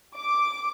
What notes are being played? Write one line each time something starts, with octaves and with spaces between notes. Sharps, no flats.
D6